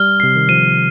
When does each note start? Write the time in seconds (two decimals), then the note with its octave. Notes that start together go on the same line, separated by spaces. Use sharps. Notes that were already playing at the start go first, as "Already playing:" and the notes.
Already playing: G3 F6 G7
0.20 C3 C7
0.36 D#3
0.49 F3 D#7